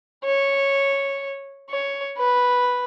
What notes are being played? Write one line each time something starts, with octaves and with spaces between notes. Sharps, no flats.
C#5
C#5
B4